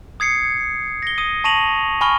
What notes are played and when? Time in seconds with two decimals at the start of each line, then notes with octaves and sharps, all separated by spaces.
0.20 D#6 G#6 C7 C#7
1.02 A#6 G7
1.18 D#6 D#7
1.44 A5 C#6 A#6 D#7 F7 F#7
2.01 G#5 B5 C#6 F6 G7